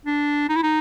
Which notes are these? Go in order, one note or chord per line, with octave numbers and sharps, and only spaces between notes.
D4
D#4
E4
D#4